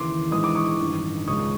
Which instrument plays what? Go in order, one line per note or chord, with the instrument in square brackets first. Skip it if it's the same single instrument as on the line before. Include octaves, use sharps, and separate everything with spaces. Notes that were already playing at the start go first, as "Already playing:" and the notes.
Already playing: [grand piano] D#2 C#3 E3 C6 D6
A#1 G#2 E3 G#3 D#6
D6
C#6 D#6
A1 G2 D#3
C#2 C#3 F3 G#3 C#6 D#6